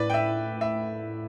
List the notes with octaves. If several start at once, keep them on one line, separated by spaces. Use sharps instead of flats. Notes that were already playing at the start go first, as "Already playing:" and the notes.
Already playing: A2 A3 E4 B4 D5
G5
E5
E5